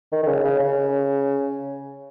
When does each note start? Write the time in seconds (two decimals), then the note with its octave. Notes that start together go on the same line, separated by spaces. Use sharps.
0.12 D#3
0.23 D#3
0.27 C#3
0.44 C#3
0.60 C#3